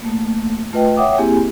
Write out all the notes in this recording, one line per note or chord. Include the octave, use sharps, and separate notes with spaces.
A3 A#3
A3 F4 B4 D#5 G5
C#5 E5 F#5 G5 D6 D#6
A#3 C4 E4 G4 G#4 G#5